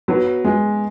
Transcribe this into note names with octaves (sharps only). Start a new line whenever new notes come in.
F#3 B3
G#3 B3